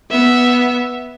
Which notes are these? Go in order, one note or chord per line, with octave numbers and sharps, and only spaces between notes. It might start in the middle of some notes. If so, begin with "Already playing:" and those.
B3 E5